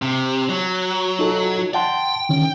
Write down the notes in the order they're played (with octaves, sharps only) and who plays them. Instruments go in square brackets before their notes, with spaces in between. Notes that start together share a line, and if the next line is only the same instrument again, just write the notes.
[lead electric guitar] C3
F#3
[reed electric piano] D#4 F4 A4
[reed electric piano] F#5 A5 C6 [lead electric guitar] G5
[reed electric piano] D3 D#3 C#4